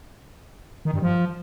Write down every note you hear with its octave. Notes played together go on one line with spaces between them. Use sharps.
D#3
G2
F3